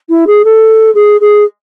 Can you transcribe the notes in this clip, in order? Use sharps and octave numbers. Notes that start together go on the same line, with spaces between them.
E4
G#4
A4
G#4
G#4